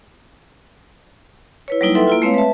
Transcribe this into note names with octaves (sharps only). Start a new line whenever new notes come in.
E4 B4 C#5
F#3 G3 A#3 D#4 E4
A4 B4 E5 F#5 G5 C6
A#3 E4 F4
G#3 A3 C4 B4 C#5 F5
B4 E5 A5